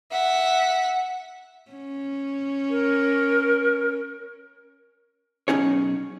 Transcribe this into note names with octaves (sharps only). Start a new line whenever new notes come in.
E5 F#5
C#4
A#4
B1 C#4 D#4 G#4 C#5